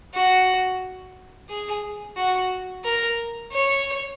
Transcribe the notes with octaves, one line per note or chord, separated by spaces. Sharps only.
F#4
G#4
F#4
A#4
C#5